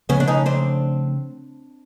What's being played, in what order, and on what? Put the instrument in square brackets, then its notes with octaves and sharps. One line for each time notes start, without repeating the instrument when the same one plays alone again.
[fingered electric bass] C#3 F3 A3 [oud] B3 C#4
[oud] D4
C#4 D#4
C4 D4